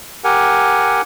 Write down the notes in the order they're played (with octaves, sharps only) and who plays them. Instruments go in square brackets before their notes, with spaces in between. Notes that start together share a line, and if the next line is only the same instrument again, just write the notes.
[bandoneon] G4 A#4 F#5 G#5